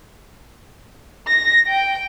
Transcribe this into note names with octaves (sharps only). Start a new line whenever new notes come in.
A#6
G5